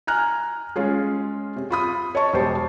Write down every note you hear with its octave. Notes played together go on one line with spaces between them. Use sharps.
G#5 A#5 F6 F#6
G#3 C#4 F4 G#4
C3
F4 B5 D#6
C#5 D#5 A5 C#6
E1 G4 C5 A5